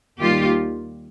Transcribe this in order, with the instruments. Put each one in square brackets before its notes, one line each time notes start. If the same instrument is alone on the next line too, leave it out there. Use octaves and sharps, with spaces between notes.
[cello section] D#2 D#3 G3 A#3 F4 G4